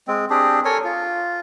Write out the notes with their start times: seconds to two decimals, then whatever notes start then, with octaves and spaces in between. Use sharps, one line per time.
0.07 G#3 C4
0.30 C4 D4 G4 G#4
0.65 A4 A#4 C#5 G#5
0.84 F4